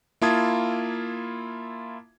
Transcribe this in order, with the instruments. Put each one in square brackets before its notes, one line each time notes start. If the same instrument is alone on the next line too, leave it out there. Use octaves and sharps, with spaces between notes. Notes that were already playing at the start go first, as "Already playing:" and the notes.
[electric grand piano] A#3 E4 F4 A5 D#6 G#6